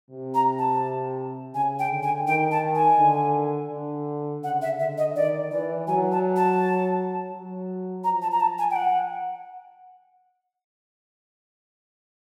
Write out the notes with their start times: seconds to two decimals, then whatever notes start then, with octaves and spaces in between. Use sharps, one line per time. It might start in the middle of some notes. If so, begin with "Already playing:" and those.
0.11 C3
0.34 A#5
0.58 A5
1.54 C#3 G#5
1.79 G5
1.91 D3
2.03 G#5
2.26 D#3 G5
2.51 A5
2.75 G#5
2.99 D3
3.71 D3
4.43 C#3 F#5
4.62 E5
4.79 D3 E5
4.98 D#5
5.16 D#3 D5
5.51 E3 D5
5.87 F#3 G#5
6.12 A5
6.36 A5
7.32 F#3
8.04 F3 A#5
8.22 A5
8.31 A#5
8.40 A5
8.58 G#5
8.71 G5
8.76 F#5